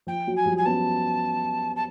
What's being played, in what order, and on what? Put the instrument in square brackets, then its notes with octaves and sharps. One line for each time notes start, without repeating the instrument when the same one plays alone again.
[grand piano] F3 [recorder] G5
[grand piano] F#3
[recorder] G#5
[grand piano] F3 G3
[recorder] G#5
[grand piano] B3 C#4 [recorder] A5
[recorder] A5